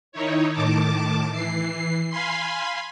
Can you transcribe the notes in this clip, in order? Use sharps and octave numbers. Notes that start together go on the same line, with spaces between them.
D#3 D#4 E4 C#5
A2 D#3 A5 D6
E3 C7
F5 G#5 B5 C6